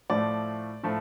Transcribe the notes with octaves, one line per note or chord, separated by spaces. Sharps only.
A2 F3 A3 D5
A2 F3 A3